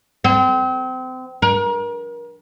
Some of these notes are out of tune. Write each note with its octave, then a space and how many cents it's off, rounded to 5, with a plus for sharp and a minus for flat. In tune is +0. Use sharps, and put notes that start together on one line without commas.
C4 -30
A#4 +35